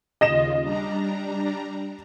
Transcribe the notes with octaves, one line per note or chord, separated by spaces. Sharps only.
D#2 C#3 F4 D#5 A#6 E7
G3 D4 A#5